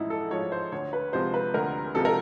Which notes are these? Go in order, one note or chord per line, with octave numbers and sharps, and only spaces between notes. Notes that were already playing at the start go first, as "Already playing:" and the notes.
Already playing: A1 G#2 F3 G#3 D#4 E4
A4
G#2 F3 G#3 C#5
C5
D2 C#5
B4
C3 F3 G#3 C5
B4
D2 A#4
C3 F3 G#3 A4
A#4